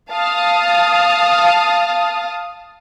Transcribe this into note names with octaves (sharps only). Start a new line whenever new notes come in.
F5 A5 D#6